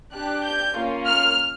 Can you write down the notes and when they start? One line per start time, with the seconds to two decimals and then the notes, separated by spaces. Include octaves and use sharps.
0.14 D4 G4 F#6
0.44 G6
0.75 A#3 C#4 F4
1.06 F6